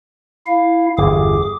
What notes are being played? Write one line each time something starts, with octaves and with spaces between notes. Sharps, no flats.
E4 F5
G1 E2 G#4 D6